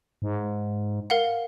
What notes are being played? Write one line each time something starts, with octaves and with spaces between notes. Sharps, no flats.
G#2
A#4 F5 F#5